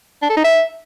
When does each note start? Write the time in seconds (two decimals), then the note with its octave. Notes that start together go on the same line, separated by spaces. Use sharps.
0.22 D4
0.29 A4
0.37 D#4
0.44 E5